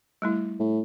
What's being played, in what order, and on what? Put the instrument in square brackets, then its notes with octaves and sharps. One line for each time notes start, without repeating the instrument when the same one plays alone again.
[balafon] G3 A3 E4
[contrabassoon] A2